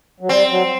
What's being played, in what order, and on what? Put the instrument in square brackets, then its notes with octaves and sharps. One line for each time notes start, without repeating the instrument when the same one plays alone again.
[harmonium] F#3
[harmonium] G3 [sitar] C4
[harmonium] F#3